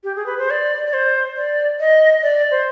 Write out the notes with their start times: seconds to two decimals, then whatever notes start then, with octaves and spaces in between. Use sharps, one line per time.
0.04 G4
0.16 G#4
0.26 B4
0.38 C5
0.50 D5
0.86 D5
0.93 C5
1.36 D5
1.80 D#5
2.23 D5
2.51 C5